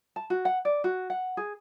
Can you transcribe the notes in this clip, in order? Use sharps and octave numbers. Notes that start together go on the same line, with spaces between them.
A5
F#4
F#5
D5
F#4
F#5
G#4